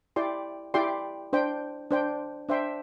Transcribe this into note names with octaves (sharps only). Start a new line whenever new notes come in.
E4 G4 D5 G5 C6
E4 G4 D5 G5 C6
D4 C5 G5
D4 C5 G5
D4 C5 E5 G5 C6